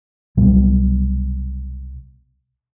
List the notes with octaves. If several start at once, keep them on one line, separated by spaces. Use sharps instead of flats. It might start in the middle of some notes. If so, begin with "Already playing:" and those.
C2 B2 F#3 G3